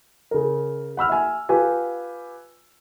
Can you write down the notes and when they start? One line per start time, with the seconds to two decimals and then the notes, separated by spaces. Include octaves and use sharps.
0.31 C#3 A#4
0.97 F#5 B5 E6 F6
1.09 E5 G#5
1.49 F4 G4 B4 G#5